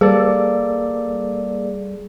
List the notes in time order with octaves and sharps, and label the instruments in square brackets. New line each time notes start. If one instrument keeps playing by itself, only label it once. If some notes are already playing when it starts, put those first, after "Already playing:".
[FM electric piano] G3 [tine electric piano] A#3 A4 D5 [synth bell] G#4